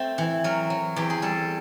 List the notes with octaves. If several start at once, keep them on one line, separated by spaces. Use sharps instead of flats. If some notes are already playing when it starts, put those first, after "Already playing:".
Already playing: A3 C4 C5
E3
F#3 A#4
F#3
E2 G4
G#4
G3 A4